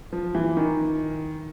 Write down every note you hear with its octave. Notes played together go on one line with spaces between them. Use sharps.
F3
E3
D#3